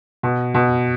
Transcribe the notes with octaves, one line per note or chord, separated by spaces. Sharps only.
B2
B2